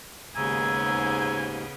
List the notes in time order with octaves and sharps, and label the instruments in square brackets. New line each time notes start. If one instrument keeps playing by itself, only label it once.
[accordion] D#2 G#2 [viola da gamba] C#3 B3 [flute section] G#4 A#5 E6 [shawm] G#5